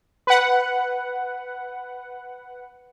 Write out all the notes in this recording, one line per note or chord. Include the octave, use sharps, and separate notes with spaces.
B4 F#5